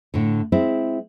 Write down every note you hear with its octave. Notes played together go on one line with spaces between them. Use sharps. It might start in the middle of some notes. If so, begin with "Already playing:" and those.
A2 D3
G#3 C4 E4